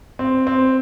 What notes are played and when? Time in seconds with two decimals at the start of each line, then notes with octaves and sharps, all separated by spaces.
0.19 C4
0.47 C4